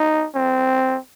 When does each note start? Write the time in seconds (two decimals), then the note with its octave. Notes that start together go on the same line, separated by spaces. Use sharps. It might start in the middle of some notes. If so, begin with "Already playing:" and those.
Already playing: D#4
0.35 C4